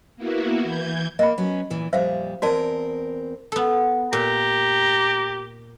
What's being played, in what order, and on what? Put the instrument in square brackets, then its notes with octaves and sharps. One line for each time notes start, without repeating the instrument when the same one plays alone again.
[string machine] A#3 B3 E4 F#4
E3 G6 G#6
[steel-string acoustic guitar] A#3 [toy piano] D#5 B5
[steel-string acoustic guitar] F#3 B3 C#4
E2 A#2 E3
[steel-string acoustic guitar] F2 A#2 G3 [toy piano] C5 E5 F5
[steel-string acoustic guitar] E2 C4 A#4 [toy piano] F#4 D5 A5
[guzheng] B3 A4
[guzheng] A#2 [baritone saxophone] G4 [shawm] A#5